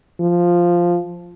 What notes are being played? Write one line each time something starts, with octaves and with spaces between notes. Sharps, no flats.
F3